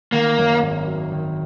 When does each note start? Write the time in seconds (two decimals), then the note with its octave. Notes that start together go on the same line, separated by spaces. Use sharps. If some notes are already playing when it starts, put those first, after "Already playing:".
0.12 D#3 A#3
0.38 F#2
0.63 G#1
0.87 F#3
1.12 D#3